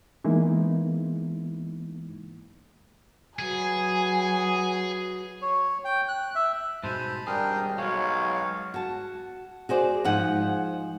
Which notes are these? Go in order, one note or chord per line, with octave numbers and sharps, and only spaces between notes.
E3 G#3 A#3 B3 D#4 E4
F#3 F#4 G#4 B4 G#5
C#5
G5
F#6
E5
G#2 B2 G#3 C5 A5 B5
G#1 G3 D4 G#4 A#4 G5 D#6
B1 F#3 G#3 C#5 F5
F#4 A5
F#4 G#4 C5 D5
G#2 F3 F#5